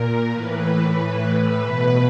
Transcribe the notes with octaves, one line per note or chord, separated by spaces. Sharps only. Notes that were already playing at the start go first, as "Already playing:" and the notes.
Already playing: A#2 A#4
A2 E3 B4
B2 B4